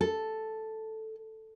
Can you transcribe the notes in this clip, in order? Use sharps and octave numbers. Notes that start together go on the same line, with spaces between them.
A4